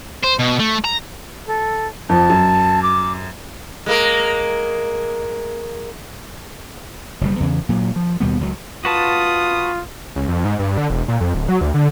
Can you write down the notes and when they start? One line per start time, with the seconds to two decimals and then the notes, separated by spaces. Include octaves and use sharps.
0.23 C5
0.39 B2
0.59 A3
0.85 A#5
1.46 A4
2.09 F2 F3 A5
2.30 F#2
2.82 D6
3.86 G#3 A#3 A#4
7.21 F#1 B2 G3
7.40 E2 C#3 E3
7.69 A#2 F#3
7.96 F3
8.20 D#2 B2 G3 B3
8.41 C#2 F#3
8.85 F4 F#4 B4 A5 D#6
10.16 C#2
10.28 F2
10.45 G#2
10.59 G2
10.78 D3
10.90 E1
11.08 A#2
11.20 F2
11.34 D1
11.49 F#3
11.61 D2
11.74 D3